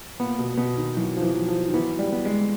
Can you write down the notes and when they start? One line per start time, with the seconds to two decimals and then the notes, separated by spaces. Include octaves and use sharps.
0.20 A#2 B3
0.38 B2
0.57 B2 B3
0.77 D#3
0.96 E3 F#3
1.17 F3
1.22 E3
1.35 F#3
1.48 F3
1.68 D#3
1.73 E3 B3
1.99 G3
2.12 B3
2.25 G#3